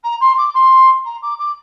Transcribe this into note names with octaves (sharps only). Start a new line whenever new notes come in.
A#5
C6
D6
C6
A#5
D6
D6